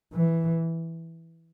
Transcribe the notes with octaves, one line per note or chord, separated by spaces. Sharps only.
E3